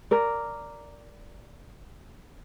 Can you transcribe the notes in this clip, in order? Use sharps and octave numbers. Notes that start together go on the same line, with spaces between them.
A#4 D5